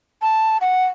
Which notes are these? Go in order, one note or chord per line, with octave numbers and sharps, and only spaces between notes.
A5
F#5